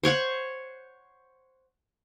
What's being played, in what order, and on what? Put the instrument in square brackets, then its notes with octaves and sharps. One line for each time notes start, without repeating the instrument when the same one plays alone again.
[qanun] C5 C#5 F#5 C#6